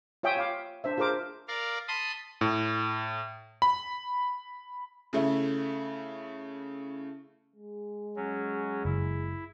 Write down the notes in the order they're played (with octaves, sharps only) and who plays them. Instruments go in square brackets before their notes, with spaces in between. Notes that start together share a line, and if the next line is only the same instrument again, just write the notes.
[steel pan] F4 C#5 E5 G5 G#5 D#6
F4 F5 B5 D6
D4 C5 E5
F4 G#4 A#4 C5 D6
[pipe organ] A#4 D5 F5
A5 B5 C6 D#6
[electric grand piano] A2
B5
[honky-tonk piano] C#3 A3 E4
[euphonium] G#3
[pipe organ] F#3 C#4
[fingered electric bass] F#1 [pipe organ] E4